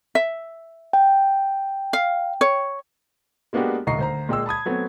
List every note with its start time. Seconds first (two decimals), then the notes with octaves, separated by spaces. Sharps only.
0.15 E5
0.93 G5
1.93 F5
2.41 C#5
3.53 G#3 A#3 B3 D4 F#4 G4
3.87 D#1 D2 D#5 A#5 C#6 C7
3.99 D2 C5 A#5
4.29 A#2 G#3 G5 C6 E6
4.46 A5 B5 D#6 G#6
4.66 F#3 A3 B3 C4